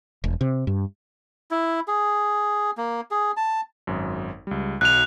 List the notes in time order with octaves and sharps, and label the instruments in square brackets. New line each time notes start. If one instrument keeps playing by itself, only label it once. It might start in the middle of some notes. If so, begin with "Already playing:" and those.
[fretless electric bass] E1
C3
G2
[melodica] E4
G#4
A#3
G#4
A5
[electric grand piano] G#1 F#2
C#2 G3
[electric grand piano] B1 F#3 [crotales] F#6 F7